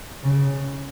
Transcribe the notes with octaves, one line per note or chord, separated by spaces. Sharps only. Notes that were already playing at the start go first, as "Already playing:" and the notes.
C#3